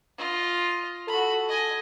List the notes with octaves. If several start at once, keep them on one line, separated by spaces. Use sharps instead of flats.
F4 D#5
F#4 A4 B5
D#5 G#5